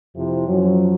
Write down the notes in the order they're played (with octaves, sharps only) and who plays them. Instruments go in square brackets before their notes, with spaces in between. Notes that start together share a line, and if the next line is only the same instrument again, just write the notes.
[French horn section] F2 C3 F3 E4
F#2 F3 F#3